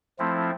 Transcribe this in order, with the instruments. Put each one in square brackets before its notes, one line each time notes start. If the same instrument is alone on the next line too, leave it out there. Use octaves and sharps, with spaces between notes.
[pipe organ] F3 A3 C4 E4